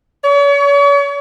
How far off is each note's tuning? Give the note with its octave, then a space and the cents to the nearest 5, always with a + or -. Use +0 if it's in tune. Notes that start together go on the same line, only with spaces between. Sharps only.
C#5 +40